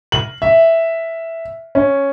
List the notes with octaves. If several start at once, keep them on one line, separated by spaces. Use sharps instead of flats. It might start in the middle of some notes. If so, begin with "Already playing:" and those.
F#7
E5
C#4